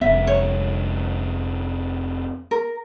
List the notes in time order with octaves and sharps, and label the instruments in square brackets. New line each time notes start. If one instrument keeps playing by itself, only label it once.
[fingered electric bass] F1 B3 [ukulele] E5
[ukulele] C#5
A#4